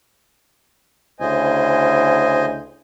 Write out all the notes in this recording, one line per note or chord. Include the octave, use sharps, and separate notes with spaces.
D2 C#3 E4 C5 D#5 G#5